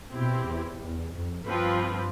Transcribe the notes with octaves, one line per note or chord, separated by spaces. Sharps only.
B2 C4 E4 G4
E2
E2
F2
G2 F3 C4 F4 B4